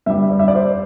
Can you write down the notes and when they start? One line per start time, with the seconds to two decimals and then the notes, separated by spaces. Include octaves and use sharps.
0.06 G2 G3 E5
0.30 D5
0.39 E5
0.48 D5
0.55 C5